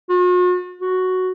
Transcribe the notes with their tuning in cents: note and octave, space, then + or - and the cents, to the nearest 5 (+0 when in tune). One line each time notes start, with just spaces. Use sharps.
F#4 -45
F#4 +0